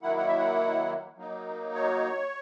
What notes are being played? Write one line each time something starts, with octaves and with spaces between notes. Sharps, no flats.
D#3 F#3 A#3 E4 F#5
F#5
E5
F#5
F#3 A#3 D#4
C#5